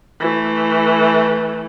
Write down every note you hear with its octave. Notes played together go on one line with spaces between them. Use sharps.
E3 A3